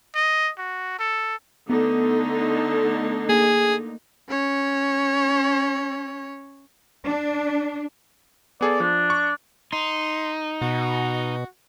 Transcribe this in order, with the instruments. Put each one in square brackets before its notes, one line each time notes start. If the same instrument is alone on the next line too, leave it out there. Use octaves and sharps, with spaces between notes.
[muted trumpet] D#5
F#4
A4
[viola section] D3 A3 D#4 [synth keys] B3
[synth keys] A#3 [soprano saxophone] G#4
[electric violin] C#4 C#5
[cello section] D4
[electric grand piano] B3 G#4 A4 [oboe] D5
[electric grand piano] F3 [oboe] D4
[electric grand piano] C#6
[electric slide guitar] D#4 [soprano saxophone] C6
[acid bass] B2 [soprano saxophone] F#4